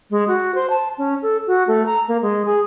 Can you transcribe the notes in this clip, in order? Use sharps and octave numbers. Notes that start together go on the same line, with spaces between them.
G#3
F#4
C5
A5
C#4
A4
F#4
A3
A#5
A#3
G#3
G#4